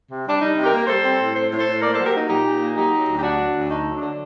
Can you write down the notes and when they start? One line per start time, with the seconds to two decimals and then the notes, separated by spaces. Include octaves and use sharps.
0.09 C3
0.25 G3 D4
0.40 G3 D#4
0.56 C3
0.63 G4 A#4
0.72 A#3
0.78 A#4
0.87 G3 A4 C5
1.03 C4
1.18 A2
1.34 C4 A4 C5
1.51 A2
1.58 A4 C5
1.66 A2
1.81 A#3 A#4 D5
1.93 F#3 A4 C5
2.05 G4 A#4
2.14 A#3 D#4
2.29 A#2 D#4 G4
2.45 A#2
2.60 A#3
2.75 F#3 D#4 G4
2.92 F#3
3.08 D2
3.18 G4
3.23 F#3 D4 F#4
3.39 F#3
3.54 D2
3.70 A3 D#4
3.86 F#3
3.94 D4
4.02 D3